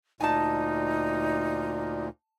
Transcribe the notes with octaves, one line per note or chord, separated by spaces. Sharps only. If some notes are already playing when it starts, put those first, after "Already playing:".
D2 A#2 D#4 G#5 A5